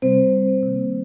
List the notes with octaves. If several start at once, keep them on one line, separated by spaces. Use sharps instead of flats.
C3 G3 C4 C5
C3 D#3 A#3